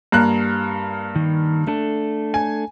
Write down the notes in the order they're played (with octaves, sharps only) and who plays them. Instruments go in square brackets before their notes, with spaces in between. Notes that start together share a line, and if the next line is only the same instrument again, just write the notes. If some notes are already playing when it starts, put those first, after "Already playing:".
[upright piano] G2 A#3 F#6
[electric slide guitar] D#3
A3 D4 A4
[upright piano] G#5